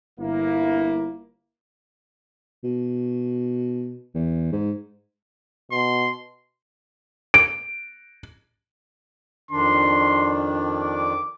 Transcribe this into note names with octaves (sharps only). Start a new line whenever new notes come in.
G1 A#3 E4
B2
E2
G#2
B2 C6
D7
F2 D#3 D4 C6
D6